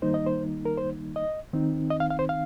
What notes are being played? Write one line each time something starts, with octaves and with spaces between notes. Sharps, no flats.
D#3 G3 A#3 D#4 C5
D#5
C5
A#4
C5
D#5
D#3 C4 D#4
D#5
F5
F5
C5
F5